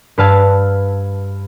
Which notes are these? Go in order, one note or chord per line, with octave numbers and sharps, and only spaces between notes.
G2 B4 F5 A5 E6 G#6